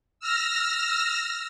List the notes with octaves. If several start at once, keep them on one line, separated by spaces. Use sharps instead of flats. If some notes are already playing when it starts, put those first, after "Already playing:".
E6 F6 A#6